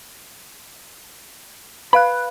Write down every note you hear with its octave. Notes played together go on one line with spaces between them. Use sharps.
B4 F5 B5 F#6